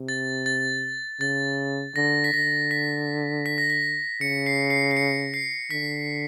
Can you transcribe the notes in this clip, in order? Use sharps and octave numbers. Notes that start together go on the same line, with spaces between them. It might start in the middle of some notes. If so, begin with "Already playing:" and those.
Already playing: C3
A6
A6
C#3 A6
D3 A#6
B6
D3 A#6
B6
B6
A#6
B6
C#3 C#7
C7
C7
C7
C#7
C7
D3 B6